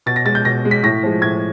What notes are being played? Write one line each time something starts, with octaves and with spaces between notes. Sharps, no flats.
B2 A6
A#6
G#3 A6
G6
B2 A#6
G#3
B6
A2 A#6
F3 G#3
A2 G#6